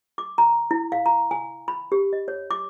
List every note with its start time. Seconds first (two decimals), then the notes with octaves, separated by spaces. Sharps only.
0.18 D6
0.38 A#5
0.71 E4
0.92 F5
1.06 A#5
1.31 G#5
1.68 B5
1.92 G4
2.13 D#5
2.28 C#5
2.51 D6